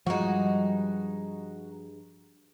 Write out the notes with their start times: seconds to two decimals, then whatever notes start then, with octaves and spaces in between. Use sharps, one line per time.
0.06 G2 F3 G#3 D#4 F#4